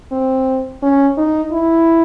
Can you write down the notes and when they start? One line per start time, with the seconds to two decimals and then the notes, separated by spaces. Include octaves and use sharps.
0.12 C4
0.83 C#4
1.17 D#4
1.52 E4